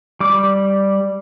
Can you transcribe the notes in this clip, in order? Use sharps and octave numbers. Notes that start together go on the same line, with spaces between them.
G3 D6